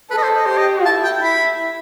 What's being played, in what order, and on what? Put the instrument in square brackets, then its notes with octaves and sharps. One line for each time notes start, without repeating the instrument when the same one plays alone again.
[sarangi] A4 [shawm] B4
[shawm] D#5
C5
D#5
[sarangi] G4 [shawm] C5
[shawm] D#5
[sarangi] E4 [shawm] A5
[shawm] G5
[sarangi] E4 [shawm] B5